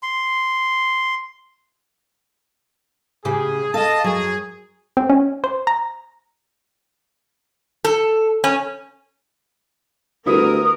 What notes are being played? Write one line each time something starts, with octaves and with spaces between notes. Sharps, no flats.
C6
A2 C#3 G4 G#4
A4 D#5 F5 A5
F#2 F#3 G#4
C4
C#4
C5
A#5
A4
C#4
D2 G3 B3 E4 A#4 D#6